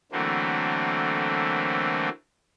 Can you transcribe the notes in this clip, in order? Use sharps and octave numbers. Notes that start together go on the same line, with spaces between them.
D3 E3 F#3 A3 A#3 C4